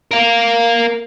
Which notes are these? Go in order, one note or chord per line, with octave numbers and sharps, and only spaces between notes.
A#4 F5